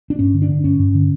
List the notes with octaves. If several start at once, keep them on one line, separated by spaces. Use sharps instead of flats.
D4
G2 C#4
D3
D4
D3
G2 C#4
G2
D3